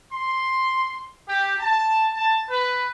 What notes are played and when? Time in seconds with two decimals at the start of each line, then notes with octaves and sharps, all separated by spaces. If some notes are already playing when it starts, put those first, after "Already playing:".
0.12 C6
1.27 G4
1.59 A5
2.12 A5
2.49 B4